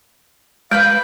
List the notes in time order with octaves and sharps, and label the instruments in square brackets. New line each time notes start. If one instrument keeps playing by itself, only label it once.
[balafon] G#3 [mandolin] B4 B5 G6 [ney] F5